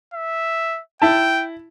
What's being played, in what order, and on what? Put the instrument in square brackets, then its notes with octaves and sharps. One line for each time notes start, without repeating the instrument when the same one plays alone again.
[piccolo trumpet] E5
[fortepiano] E4 A5 [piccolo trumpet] G5